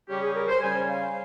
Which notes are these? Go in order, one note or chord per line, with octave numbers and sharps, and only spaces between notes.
C#3 G3 C#4 G4
G#4
A#4
C5
C#3 G3 C#4 G#5
F5